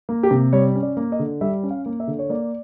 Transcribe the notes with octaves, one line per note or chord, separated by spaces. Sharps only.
A#3
G4
C3
G3 C#5
C#4
D5
A#3
D#5
D3
G3 E5
C#4
F5
A#3
E5
D3
C#5
A#3 D5